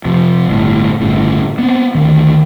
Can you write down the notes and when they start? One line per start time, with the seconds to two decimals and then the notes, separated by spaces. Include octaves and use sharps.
0.05 F2 C3
0.48 G1 A2
1.00 G1 A2 C#3
1.59 B3 C4
1.95 D2 D#3